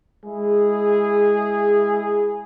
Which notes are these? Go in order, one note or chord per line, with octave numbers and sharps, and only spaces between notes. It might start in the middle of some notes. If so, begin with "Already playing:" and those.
G#3 E4 G#4